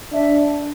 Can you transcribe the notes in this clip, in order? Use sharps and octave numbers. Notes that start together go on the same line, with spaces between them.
D4 E5